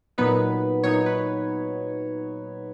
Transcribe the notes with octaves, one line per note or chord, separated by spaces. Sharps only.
A#2 F#3 B3 D#4 B4
A#2 F#3 B3 D#4 C#5
B4